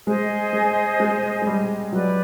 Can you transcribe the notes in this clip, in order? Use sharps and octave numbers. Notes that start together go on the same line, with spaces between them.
G#3 G#4 C5 D#5 G#5
G#3
G#3
G#3
G3
F#3 G4 B4 D5